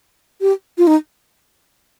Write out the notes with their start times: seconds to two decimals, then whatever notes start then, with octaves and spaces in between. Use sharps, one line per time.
0.41 G4
0.78 F4
0.87 D#4